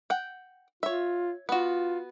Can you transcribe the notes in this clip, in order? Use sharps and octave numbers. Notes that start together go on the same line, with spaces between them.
F#5 G5
F4 C#5 E5
B3 F4 F#4